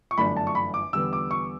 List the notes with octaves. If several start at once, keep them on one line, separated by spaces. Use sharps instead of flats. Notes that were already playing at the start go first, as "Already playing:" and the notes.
C#6
G1 F#2 E3 A3 D4 B5
A5
C#6
B5
D6
E2 D3 G3 B3 E6
D6
C#6